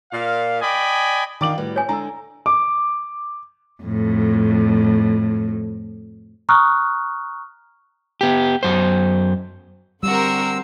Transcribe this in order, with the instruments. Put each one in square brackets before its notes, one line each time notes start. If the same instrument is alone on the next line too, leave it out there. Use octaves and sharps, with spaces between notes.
[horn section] A#2 F5
D5 D#5 G5 G#5 B5
[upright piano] D#3 D6 F#7 [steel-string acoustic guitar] D4 F4 D5
[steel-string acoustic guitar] A2 G3 F#4 [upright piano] B4
[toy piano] C#5 G#5
[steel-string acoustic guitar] D3 G#3 D4 [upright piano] A#5 E6
[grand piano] D6
[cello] F2 A2
[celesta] A#5 C#6 D#6 F6 F#6
[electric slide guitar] B3 G4
F#2 C5
[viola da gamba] D3 C4 C5 [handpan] G3 [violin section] F#4 A#4 [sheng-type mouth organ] E6